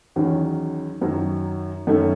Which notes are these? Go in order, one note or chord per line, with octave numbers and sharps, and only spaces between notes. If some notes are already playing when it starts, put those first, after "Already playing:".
E2 D#3 F#3 C#4
F#2 D#3 F#3
F#2 D#3 A3 C#4